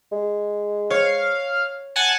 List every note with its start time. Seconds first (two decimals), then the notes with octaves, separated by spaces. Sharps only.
0.12 G#3
0.90 C#5 F5
1.96 F#5 G#5 A5